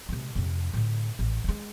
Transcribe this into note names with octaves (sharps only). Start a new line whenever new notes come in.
C3 G#3
F2 C3
A2 D3
A1
G#3 A3